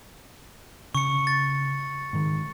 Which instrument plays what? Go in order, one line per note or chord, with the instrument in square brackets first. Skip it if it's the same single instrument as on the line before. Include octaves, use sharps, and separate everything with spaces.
[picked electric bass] C#3 [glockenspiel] C#6 C#7
[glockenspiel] A6
[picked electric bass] G#2 D#3